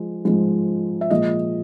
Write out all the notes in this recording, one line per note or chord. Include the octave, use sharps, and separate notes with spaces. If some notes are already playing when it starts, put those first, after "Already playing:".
Already playing: F3 G#3
G#2 F3 G#3
E5
A#2 F3 G#3 D#5